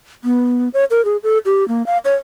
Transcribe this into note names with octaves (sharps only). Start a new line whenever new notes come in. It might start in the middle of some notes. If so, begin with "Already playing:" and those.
B3
C#5
A#4
G#4
A4
G4
A#3
F5
C#5